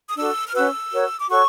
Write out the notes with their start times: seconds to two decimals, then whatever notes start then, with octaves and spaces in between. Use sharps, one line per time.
0.08 D#6
0.15 D4 F#4 A4 E6
0.46 F6
0.53 C#4 F#4 B4 E6
0.91 F#4 A#4 C#5
1.19 D6
1.29 F#4 A4 C#5 C#6